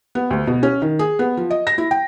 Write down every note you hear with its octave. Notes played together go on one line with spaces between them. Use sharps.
B3
D2
B2
C#4
D#3
G#4
B3
F3
D#5
A#6
E4
G5